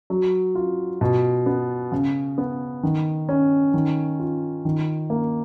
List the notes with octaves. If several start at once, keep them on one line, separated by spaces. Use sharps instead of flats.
F#3
F4
B2
B3
C#3
B3
D#3
C#4
D#3
F4
D#3
A#3